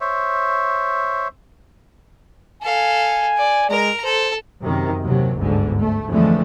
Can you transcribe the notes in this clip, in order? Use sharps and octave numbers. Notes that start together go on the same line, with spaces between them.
C5 C#5 E5
A4 F5 G#5
D5
G#3 A#4 A#5
A4 C5
F#2 C3 D#3
D#2 C3 F#3
G1 D2 G#2 D3
A3
F2 D3 E3 F3 G#3 A3